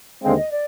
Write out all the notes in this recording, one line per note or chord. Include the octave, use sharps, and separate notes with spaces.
D#2 D3 G#3 C4 F5
D#5
D5